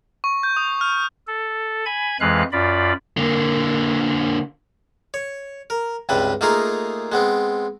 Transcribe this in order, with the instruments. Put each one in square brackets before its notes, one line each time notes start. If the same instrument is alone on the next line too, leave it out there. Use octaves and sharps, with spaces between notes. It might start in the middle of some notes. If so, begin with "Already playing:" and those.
[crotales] C#6
G6
D#6
F6
[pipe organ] A4
G#5 B5 G#6
F2 E3 G#3 B4 F5 F#6
F#2 F4 D5 B5
[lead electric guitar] D3 A#3
[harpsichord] C#5
A#4
C#2 G2 C3 G3 B4
A3 A#3 D#4 F4 G#4 A#4
G#3 B3 C4